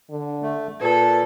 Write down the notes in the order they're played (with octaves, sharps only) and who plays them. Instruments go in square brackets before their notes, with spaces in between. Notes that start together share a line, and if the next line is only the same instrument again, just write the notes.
[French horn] D3
[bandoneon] A3
[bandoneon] A#2 [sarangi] A4 [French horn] B4